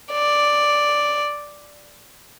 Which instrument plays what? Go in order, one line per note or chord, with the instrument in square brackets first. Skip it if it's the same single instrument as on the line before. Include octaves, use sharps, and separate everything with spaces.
[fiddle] D5